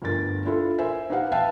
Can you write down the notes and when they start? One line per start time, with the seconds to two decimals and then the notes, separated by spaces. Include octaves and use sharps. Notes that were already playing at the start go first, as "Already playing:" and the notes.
0.02 G1 D2 D3 A#4 A6
0.45 D4 E4 F4 A4
0.78 A#4 C5 E5 G#5
1.10 D#4 G4 B4 F5 F#5
1.32 B4 E5 F5 G5 A5